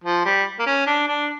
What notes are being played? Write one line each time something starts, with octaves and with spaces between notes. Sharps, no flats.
F3
G3
A#3
C#4
D4
D4